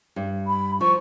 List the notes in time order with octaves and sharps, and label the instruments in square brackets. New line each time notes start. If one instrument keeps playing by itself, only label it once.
[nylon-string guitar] G2
[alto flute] B5
[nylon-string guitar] F3 [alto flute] C#6